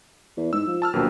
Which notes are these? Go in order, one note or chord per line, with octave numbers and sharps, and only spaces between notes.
E2
G#2 E6
F3
A5 E6 F6
A#1 D#2 B2 F#3